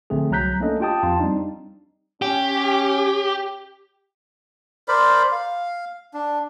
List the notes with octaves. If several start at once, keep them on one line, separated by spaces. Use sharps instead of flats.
A#1 D3 A3 C4 G#4
C2 F#3 A#5 F#6 G6 B6
A3 A#3 C#4 D4 A4 D#5
F4 G4 G5 A5 D#6
F2 F4 A5
G3 C4 D4 D#4
C#4 G4
A#4 C5 D5 B5
F5
D4